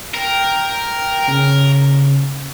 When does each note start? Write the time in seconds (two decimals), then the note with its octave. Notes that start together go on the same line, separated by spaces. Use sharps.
0.14 A#4 G5
1.28 C#3